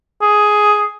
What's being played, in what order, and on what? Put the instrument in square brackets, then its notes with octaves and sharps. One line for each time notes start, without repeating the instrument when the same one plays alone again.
[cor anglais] G#4